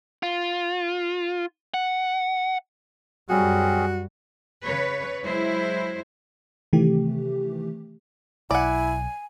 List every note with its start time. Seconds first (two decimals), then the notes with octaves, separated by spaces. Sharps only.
0.23 F4
1.74 F#5
3.30 F#2 G3 C4 C#4 F#4 G#4
4.63 C#3 B4 C#5
5.23 F#3 G#3 E4 C5
6.73 C3 D#3 E3 A3 G4
8.51 B1 E4 D5 F#5 G#5